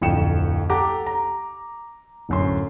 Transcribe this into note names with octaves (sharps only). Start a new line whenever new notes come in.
D1 F2 G5 C#7 E7
G4 A4 F#5 A5 A#5 D6
A#5
D1 F#2 C6